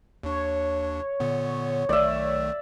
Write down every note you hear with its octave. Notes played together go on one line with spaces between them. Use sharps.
D#2 D4 C#5
A#2 D3 B3
B1 D#3 A3 D5 E5